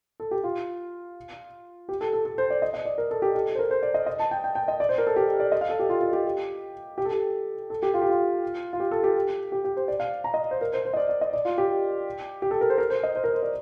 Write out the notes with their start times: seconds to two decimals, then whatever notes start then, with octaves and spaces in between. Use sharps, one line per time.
0.20 A4
0.31 G4
0.44 F4
1.89 G4
2.01 A4
2.13 A4
2.25 A4
2.38 C5
2.50 D5
2.62 D#5
2.74 D#5
2.85 D5
2.98 A#4
3.11 A4
3.22 G4
3.35 A4
3.55 C5
3.59 A#4
3.71 C5
3.83 D5
3.94 D#5
4.07 D#5
4.19 A5
4.31 G5
4.44 G5
4.55 G5
4.68 D#5
4.80 D5
4.89 C5
4.98 A#4
5.07 A4
5.16 G4
5.40 D5
5.52 D#5
5.61 F5
5.70 A4
5.79 G4
5.89 F4
6.01 F4
6.13 G4
6.98 G4
7.05 A4
7.12 G4
7.70 A4
7.83 G4
7.94 F4
8.01 G4
8.10 F4
8.73 F4
8.80 G4
8.91 A4
9.04 G4
9.52 G4
9.65 G4
9.77 C5
9.88 D5
10.00 F5
10.24 A#5
10.34 D#5
10.51 C5
10.61 A#4
10.73 C5
10.85 C5
10.94 D#5
10.97 D5
11.09 D5
11.21 D#5
11.34 D5
11.45 F4
11.58 G4
12.42 G4
12.51 A4
12.61 A#4
12.70 C5
12.78 A#4
12.90 C5
13.03 D#5
13.16 C5
13.24 A#4
13.34 C5
13.43 D5